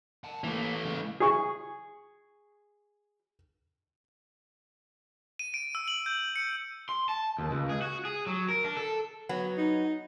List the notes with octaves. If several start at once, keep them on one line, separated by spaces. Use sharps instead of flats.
F#5 A5
E3 A3 A#3
C#3 G#3
G#4 C#6
D#7
D7
E6
F#7
G6
C#7
C6
A5
D#2
C#2
G#4
F#4
G#4
F#3
A#4
D4
A4
F#3 B3
D#4